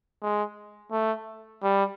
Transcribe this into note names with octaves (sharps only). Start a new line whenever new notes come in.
G#3
A3
G3